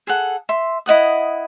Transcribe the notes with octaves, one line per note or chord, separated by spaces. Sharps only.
G#4 A4 F#5
E5 C6
E4 D#5 F#5 D#6